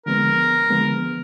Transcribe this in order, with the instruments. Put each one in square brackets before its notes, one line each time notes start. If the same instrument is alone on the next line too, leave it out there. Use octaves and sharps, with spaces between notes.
[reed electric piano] D3 F3 G#3 B3 [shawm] A#4
[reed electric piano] D3 F3 G#3 B3